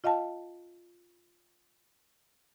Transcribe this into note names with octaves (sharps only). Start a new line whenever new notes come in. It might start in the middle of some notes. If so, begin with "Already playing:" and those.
F4 D#5 F5 G5 A5